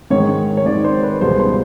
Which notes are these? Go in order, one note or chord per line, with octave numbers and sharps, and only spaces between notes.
G#2 D#3 G#3 C#5
C#5
G#2 D#3 G#3 D5
C5
B4
C#2 B2 G3 B3 C5
C5